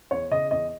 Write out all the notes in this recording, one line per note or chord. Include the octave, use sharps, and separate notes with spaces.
E2 C#5
C#3 D#5
E2 D#5